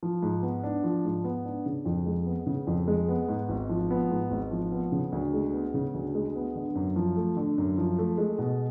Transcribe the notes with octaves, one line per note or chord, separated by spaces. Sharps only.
F3
G#2
B3
D4
F3
G#2
B3
D4
C#3
F2
G#3
B3
C#3
F2
G#3
B3
G#2
G#1
F3
B3
G#2
G#1
F3
B3
C#3
D2
G#3
B3
C#3
D2
G#3
B3
D3
F#2
F3
A3
D3
F#2
F3
A3
G#3
B2